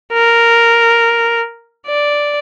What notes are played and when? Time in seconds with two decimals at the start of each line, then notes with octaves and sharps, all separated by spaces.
0.13 A#4
1.88 D5